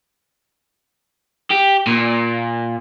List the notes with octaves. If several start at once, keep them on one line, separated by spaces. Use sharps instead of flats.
G4
A#2